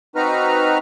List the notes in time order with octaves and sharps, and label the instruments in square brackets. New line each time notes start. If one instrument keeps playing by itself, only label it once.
[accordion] C4 D#4 F#4 B4 A#5 F6